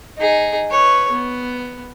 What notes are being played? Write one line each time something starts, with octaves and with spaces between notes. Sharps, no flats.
D#4 G#4
B4 C#5
B3